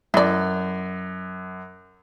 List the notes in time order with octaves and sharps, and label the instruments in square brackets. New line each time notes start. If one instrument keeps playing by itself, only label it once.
[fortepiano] F#2 [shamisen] E4 D5